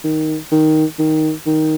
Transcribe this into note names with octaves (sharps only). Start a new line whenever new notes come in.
D#3
D#3
D#3
D#3